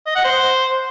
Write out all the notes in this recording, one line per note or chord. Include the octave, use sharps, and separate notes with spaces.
D#5
F#5
C5